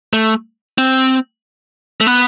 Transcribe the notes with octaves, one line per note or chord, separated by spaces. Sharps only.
A3
C4
A3
B3